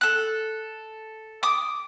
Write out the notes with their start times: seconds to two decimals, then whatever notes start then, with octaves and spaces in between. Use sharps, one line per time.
0.01 A4 F#6
1.43 D6 D#6